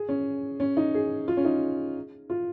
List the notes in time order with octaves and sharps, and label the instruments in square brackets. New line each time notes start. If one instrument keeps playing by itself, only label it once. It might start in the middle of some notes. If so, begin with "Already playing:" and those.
Already playing: [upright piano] G#4
C#4
C#4
D#4
G#4
F4
C#4
D#4
F4